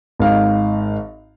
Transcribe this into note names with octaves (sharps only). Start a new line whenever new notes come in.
G#1 D#4 F5